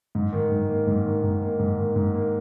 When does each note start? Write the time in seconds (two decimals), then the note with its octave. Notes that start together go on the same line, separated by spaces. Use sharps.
0.15 G#2
0.33 D#3
0.51 G#2
0.69 A#3
0.87 G#2
1.06 D#3
1.23 G#2
1.42 A#3
1.59 G#2
1.78 D#3
1.96 G#2
2.14 A#3